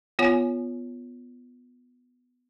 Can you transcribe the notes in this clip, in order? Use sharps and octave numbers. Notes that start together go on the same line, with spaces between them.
B3 F4 C#5 F#5 G#5